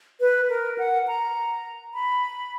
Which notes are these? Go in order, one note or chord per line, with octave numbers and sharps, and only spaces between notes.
B4
A#4
F#5
A#5
B5